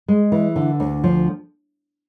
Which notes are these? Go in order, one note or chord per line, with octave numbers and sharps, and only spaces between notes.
G#3
E3
D3
D2
F3